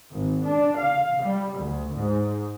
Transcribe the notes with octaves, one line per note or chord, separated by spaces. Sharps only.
G#1
D4
F5
G3
D2
G#2